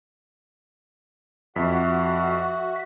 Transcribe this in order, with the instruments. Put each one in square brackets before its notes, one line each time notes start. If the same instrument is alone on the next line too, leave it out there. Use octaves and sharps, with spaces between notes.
[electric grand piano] F2 [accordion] F#4 [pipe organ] E5